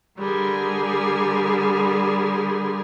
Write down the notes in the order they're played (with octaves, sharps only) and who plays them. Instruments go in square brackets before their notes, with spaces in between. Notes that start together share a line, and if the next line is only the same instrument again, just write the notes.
[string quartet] D3 G3 G#4 A#4